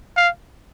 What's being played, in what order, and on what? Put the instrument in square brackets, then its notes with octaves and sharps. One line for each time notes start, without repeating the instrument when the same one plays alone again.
[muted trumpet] F5